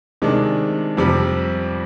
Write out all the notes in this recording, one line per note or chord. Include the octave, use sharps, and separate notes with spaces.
C3 D#3 G#3 D4
F2 C3 G3